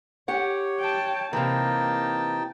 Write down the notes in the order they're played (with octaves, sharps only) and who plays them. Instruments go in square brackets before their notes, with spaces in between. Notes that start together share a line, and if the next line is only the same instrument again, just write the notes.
[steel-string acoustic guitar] G4 F#5 [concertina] C#5
[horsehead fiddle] G5 A5
[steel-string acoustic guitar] C3 E3 [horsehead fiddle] A#3 [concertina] D#4 G5 A5